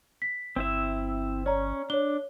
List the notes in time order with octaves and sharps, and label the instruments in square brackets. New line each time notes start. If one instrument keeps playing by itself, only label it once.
[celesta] B6
[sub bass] G1 [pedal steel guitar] C4 E4 E5
[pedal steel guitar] C#4 [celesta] C#5 D5 A#5
[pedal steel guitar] D4 [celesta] C#5 G7